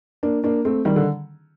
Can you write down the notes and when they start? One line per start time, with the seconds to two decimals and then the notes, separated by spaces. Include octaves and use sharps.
0.23 A#3 D4
0.44 A#3 D4
0.65 A3 C4
0.85 D#3 G3
0.96 D3